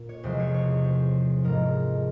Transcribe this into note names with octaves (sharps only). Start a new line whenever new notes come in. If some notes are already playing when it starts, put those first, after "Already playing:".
Already playing: A#2
C#5
E2 C3 F3 G#3 C5
C#5
C#5
C5
G#2 F3 G#3 A#4